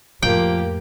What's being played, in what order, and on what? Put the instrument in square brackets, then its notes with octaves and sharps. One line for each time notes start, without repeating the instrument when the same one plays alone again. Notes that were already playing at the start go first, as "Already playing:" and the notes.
[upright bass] F2 A2 [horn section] F3 [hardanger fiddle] A#3 G4 [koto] G5